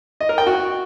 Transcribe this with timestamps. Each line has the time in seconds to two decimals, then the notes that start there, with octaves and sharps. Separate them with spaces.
0.21 D#5
0.29 A#4
0.38 G5
0.47 F#4